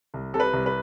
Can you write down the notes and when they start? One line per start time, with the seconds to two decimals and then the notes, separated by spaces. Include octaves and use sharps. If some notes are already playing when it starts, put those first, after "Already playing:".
0.14 C2
0.34 C3 A4
0.40 B4
0.53 C2
0.66 B4